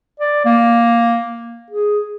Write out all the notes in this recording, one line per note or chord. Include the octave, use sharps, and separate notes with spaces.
D5
A#3
G#4